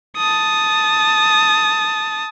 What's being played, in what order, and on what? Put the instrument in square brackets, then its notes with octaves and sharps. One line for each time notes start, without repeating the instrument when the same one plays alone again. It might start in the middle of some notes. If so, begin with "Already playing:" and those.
[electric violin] A5 D#6